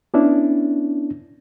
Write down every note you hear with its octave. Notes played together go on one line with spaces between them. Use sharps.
B3 C#4 D4 E4